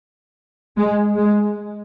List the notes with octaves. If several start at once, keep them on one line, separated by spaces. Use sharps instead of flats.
G#3
G#3